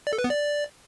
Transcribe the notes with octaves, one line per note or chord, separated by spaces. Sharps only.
D5
A4
B4
B3
D5